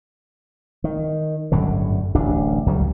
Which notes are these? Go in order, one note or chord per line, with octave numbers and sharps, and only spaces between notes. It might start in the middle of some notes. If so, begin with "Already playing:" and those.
D#3
G1 F#2 A2 D3
D1 A1 D4
C#2 F#3 G3